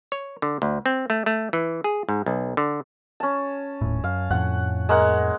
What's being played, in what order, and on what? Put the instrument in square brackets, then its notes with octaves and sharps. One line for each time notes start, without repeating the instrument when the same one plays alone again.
[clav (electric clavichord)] C#5
D3
D2
C4
A3
A3
E3
G#4
G#2
B1
D3
[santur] C#4 A5
[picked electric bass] D#1 A2
[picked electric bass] F#2 [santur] F5
[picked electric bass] F2 A2 F3 [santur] F#5
[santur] G#3 A#3 F#5